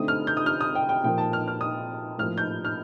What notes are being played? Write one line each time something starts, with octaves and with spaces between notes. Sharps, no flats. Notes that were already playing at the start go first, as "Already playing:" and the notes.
Already playing: D3 A3 C4 D#4 D#6
F6
G6
D#6
F6
D#6
G5
G5
A#2 F3 A#3 G5
A5
F6
F6
D#6
A2 F3 A#3 F6
G6
F6